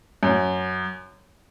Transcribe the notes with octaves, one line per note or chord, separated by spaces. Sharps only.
F#2